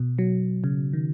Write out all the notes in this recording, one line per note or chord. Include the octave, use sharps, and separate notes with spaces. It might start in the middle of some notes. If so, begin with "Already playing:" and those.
Already playing: B2
F#3
C#3
D#3